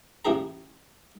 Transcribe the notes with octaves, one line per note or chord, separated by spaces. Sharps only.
A1 E4 G4 G#4 A#5